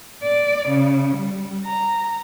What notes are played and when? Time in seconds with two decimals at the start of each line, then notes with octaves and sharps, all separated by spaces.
0.23 D5
0.69 C#3
1.17 G3
1.67 A#5